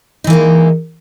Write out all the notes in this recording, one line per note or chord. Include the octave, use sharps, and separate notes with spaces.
E3 G#3 A#3 D#4